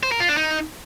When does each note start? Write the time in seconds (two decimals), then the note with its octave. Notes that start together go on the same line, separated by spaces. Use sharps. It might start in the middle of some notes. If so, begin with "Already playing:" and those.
0.03 C5
0.12 A#4
0.20 F4
0.29 D4
0.37 D#4